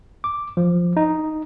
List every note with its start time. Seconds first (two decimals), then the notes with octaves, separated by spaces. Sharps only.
0.24 D6
0.57 F3
0.97 D#4